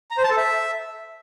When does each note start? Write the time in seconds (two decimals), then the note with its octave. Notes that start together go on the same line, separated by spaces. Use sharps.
0.11 A#5
0.17 C5
0.24 A5
0.31 A4
0.37 E5